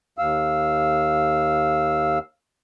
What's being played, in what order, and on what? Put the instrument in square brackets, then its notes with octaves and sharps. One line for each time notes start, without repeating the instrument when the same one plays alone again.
[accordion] D#2 F5 E6